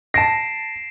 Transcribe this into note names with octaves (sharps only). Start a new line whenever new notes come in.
A5 A#6 C7 D7 E7